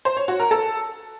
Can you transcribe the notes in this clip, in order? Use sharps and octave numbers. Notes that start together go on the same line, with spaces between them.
C5
C#5
F#4
A#4
A4